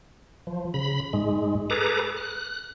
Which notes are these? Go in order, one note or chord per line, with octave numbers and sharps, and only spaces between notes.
F3
C#3 B5
G#2 G#3
G#4 A4 B4 A#5 D6
F#6